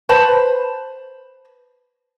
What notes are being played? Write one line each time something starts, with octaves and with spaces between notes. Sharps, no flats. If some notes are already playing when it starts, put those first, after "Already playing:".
B4 C5 A5 B5